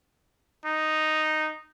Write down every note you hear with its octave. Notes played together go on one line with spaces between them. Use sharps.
D#4